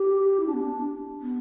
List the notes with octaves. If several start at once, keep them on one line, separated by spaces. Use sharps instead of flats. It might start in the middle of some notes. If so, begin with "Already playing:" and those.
Already playing: G4
E4
D4
B3
D4
B3